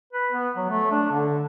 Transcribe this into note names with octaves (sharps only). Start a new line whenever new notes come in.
B4
B3
F#3
A3
D4
D3